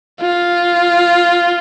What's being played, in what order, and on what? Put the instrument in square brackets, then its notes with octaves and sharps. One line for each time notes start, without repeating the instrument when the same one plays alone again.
[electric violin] F4